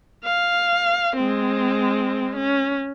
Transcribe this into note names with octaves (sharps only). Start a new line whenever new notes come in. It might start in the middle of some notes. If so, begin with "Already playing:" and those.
F5
G#3 C4
C#4